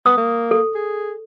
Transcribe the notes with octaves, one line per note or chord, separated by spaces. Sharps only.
B3 D#6
A#3
A4
G#4